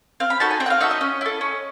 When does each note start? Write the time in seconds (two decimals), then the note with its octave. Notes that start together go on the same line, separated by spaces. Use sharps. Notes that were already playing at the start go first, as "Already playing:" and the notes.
0.20 C4 F5
0.30 B5
0.40 D#4 F#4 A4 A5
0.50 G#5
0.60 C4 G5
0.66 F#5
0.70 F5
0.80 D#4 F#4 A4 E5
0.91 D#5
1.01 C#4
1.21 E4 A4
1.41 C#4